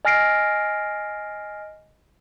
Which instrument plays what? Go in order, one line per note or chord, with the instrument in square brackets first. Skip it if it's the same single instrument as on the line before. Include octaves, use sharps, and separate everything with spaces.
[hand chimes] D#5 G#5 F6 A#6 C7 D7